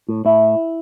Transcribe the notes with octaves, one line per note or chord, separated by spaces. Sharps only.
A2
A2 E4